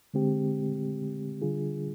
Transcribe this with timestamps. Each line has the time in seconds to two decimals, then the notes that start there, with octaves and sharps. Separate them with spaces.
0.14 D3 G#3 C4 G4
1.41 D3 G3 D4 F4 G#4